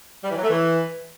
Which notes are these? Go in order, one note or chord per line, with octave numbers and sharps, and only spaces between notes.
G3
E3
F#3
A3
E3